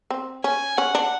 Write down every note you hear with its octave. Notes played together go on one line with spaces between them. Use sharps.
C4
C#4 G#5
C#4 F#5
D4